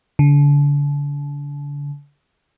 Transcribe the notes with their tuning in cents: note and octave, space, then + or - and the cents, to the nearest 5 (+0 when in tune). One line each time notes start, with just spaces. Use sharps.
D3 -35